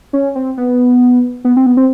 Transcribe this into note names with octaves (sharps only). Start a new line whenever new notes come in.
C#4
C4
B3
B3
C4
B3
C4